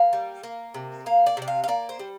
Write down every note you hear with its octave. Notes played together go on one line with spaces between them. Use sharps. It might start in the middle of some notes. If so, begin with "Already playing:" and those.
Already playing: A#3 F5
G3
A#3
C3
A#3 F5
D5
C3 D5
F5
F5
A#3 D5
C5
G3